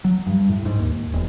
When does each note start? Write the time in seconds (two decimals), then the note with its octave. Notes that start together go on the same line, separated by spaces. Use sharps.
0.04 F#3
0.27 G2
0.50 A2
0.65 G#2
0.79 D#2
1.13 E1